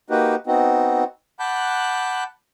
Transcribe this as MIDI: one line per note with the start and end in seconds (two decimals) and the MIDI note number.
0.10 0.35 58
0.10 0.35 63
0.10 0.35 66
0.10 0.35 67
0.10 0.35 71
0.47 1.04 59
0.47 1.04 60
0.47 1.04 63
0.47 1.04 66
1.40 2.24 78
1.40 2.24 81
1.40 2.24 83
1.40 2.24 86
1.40 2.24 90
1.40 2.24 91